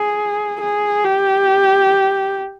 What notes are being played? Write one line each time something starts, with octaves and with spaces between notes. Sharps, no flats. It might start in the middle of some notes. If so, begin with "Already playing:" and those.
Already playing: G#4
G#4
G4